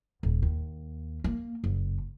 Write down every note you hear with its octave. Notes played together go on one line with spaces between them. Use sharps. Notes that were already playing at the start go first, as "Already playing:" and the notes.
D#1
D#2
A#3
F#1